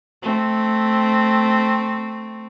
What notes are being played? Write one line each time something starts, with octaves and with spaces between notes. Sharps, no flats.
A3 C4